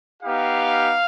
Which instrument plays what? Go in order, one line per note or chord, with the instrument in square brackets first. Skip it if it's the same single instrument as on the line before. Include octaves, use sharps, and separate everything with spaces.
[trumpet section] B3 D#4 G4 F5